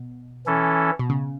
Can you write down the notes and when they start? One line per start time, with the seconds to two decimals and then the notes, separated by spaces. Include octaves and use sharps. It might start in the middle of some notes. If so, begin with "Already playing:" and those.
Already playing: B2
0.46 E3 C#4 A4
0.99 B2
1.10 C#3